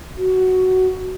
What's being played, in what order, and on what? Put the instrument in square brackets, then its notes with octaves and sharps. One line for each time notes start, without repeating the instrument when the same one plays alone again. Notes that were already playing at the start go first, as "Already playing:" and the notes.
[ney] F#4